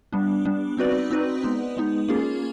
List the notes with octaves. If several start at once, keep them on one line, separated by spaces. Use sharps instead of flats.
G3 B3 D4
G3 B3 D4
C4 D#4 F#4 B4 D5
C4 D#4 F#4 B4 D5
G#3 B3 D#4
G#3 B3 D#4
A#3 C#4 F4 G#4